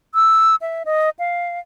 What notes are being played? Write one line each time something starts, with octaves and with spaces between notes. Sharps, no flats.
E6
E5
D#5
F5